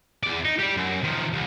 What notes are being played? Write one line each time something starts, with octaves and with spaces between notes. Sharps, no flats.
E2 D5
D#4
G4 D5
F#2
D#3 F3
C2